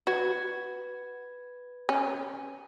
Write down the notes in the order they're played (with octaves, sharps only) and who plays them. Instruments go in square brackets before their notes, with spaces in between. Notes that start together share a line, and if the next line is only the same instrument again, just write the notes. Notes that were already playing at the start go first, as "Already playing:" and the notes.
[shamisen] F#4 [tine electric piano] B4 G#6
[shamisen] C#4